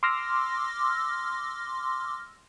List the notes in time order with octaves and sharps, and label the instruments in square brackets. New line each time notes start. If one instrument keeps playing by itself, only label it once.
[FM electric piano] C6 D6 E6 F6 A#6